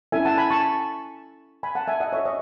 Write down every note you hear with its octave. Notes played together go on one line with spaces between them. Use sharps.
C#4 E4 A4 E5 G#5
F#5 A5
G#5 B5
A5 C#6
G#5 B5
F#5 A5
E5 G#5
D#5 F#5
F#4 A4 C#5 E5
D#5